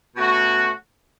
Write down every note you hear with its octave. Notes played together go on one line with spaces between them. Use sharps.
B2 A3 C#4 F#4